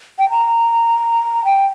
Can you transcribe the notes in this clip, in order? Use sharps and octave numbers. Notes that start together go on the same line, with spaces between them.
G5
A#5
G5